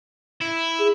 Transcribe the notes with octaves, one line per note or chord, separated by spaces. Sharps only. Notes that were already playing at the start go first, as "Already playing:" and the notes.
E4
G#4